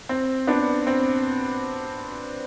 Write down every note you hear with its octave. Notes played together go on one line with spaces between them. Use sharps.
C4
B3 D4
C4